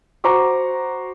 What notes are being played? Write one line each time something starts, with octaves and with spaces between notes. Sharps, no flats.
F#4 C5 A#5 C#6 D6